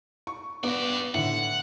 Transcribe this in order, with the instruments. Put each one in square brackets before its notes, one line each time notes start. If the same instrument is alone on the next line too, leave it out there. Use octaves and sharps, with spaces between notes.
[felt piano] C#6
[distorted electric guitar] G2 D5 [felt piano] B3
[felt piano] A2 D3 [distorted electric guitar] F#5